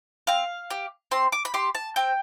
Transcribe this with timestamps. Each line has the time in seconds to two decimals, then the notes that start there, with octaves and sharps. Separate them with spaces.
0.27 C4 F5
0.70 G4
1.11 C4 C6
1.32 D6
1.45 B5
1.54 G4 C6
1.75 A5
1.96 C4 G5